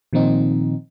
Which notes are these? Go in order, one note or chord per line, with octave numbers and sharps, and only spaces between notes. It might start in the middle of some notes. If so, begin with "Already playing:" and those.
A#2 D#3 F3 C4 D#4